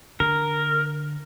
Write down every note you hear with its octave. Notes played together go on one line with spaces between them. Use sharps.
D3 A#4